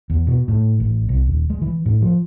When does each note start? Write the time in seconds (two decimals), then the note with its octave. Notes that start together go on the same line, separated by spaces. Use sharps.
0.10 E2
0.27 B2
0.48 A2
0.80 A1
1.09 C2
1.26 D#1
1.50 G#3
1.62 E3
1.86 A2
2.02 F3